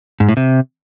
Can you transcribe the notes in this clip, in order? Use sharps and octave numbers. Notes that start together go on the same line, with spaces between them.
G#2
A2
C3